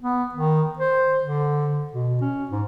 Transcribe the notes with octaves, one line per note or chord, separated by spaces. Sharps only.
B3
D#3
C5
D3
B2
C#4
G#2